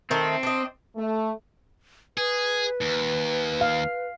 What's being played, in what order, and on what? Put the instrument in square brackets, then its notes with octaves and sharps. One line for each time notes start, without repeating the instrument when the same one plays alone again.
[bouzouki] D#3 A3 [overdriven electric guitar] C4
[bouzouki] D4 D#5
[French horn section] A3
[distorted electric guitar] G#4 [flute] B4
[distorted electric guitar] D#2
[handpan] F5